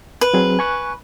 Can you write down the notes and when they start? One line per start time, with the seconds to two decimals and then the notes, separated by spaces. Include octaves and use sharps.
0.21 B4
0.34 F#3 C4 G#4
0.59 G#5 C#6 F#6